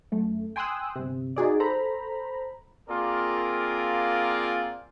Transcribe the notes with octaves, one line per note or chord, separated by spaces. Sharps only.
F#2 A3
G5 G#5 C6 D#6 E6 F#6
G1 C3
D#4 F#4 G#4 D5
A4 C5 A#5 B5
A#3 C4 F4 G#4 A#4 D5